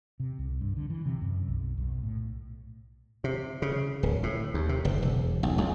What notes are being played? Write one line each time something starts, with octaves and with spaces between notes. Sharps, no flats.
C3
C2
G2
D3
E3
C3
F#2
B1
B1
A2
C3
C#3
D1
A2
D#2
C3
F#1
E1
B1
C#2